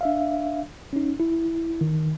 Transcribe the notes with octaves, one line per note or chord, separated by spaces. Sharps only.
D4 E5 F5
C#4 D#4
E4
D#3